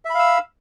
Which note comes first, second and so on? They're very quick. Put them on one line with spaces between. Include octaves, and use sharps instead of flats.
E5 B5 F5 E6